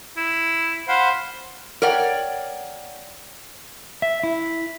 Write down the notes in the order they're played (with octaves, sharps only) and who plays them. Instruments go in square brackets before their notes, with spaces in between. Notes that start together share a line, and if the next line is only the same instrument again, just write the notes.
[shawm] E4
[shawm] C5 [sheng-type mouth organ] F5 F#5 B5
[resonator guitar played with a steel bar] A#4 C#5 D5 F#5 G5
[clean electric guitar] E5
E4